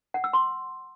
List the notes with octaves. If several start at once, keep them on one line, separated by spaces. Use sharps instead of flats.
F#5
E6
C6